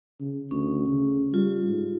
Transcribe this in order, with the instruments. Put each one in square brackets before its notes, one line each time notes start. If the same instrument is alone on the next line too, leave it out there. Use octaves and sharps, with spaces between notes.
[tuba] C#3
[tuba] D2 [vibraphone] C#4
[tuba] C#3
[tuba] G3 [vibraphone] F4
[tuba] G#2